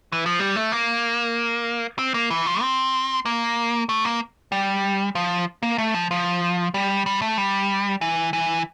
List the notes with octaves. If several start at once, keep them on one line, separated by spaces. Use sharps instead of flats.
E3
F3
G3
A3
A#3
C4
A#3
E3
F3
C4
A#3
A3
A#3
G3
F3
A#3
A3
F3
F3
G3
G3
A3
G3
E3
E3